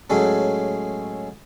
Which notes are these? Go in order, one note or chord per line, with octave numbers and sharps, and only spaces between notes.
A2 F#3 G#3 C#4 A4